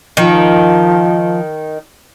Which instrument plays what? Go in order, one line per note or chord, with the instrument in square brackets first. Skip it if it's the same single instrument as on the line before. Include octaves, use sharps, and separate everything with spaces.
[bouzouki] D#3 [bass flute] F3